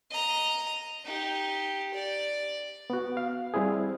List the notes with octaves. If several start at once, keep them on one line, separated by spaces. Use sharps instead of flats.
D#5 A#5
D#4 G4
D5
B3 F#4
F5
G3 C4 E4 G#4